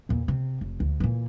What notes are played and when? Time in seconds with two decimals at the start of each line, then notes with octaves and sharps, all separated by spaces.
0.09 E2 A#2
0.28 C3
0.61 F1
0.80 D2
1.00 A#2 E3